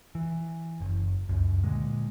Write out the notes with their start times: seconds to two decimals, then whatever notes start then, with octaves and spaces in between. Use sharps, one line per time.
0.15 E3
0.80 F#1
1.29 C#2 F#2
1.63 A#2 D3 G#3